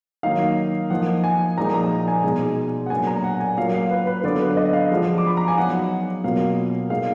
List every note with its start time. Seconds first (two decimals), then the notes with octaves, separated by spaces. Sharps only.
0.23 D#3 F#3 A#3 D#4 F5
0.90 F3 A#3 D#4 F#5
1.24 G#5
1.58 A#2 F3 G#3 D#4 A#5
1.74 A#5
2.08 G#5
2.24 B2 G#3 D#4
2.86 F#5
2.90 A#2 F#3 B3 D4 G#5
3.07 A#5
3.24 F#5
3.41 G#5
3.57 F#3 A#3 F4 F5
3.74 F5
3.91 B4
4.07 B4
4.24 D3 F#3 B3 D5
4.41 B4
4.57 D#5
4.73 F5
4.91 F3 G#3 B3 D4 F4
5.18 D6
5.27 B5
5.37 A#5
5.48 G#5
5.57 F#3 B3 D#4 F#5
6.24 B2 F#3 A#3 F4 F5
6.90 A#2 G#3 D#4 F5